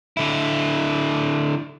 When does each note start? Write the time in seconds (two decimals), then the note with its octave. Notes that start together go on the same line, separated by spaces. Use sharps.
0.17 D3 E4